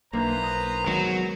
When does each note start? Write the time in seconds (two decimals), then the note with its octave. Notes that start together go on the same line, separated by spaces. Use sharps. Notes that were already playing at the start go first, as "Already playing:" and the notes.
0.13 B1 A#3 D4 E4 B4 C5 A#5
0.43 D#6
0.87 D#3 F#3 G#3 B3